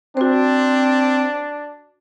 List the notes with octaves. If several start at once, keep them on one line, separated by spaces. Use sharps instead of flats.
C4 D4 F#4 C5